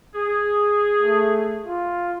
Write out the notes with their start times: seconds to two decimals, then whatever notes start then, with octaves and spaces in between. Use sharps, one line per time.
0.15 G#4
1.03 A3
1.66 F4